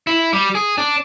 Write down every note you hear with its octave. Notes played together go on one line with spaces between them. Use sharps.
E4
G3
G#4
D4